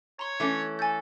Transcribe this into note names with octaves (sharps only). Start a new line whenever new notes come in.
C#5 A#5 C6
E3 A3 C#4
A4 G#5 G6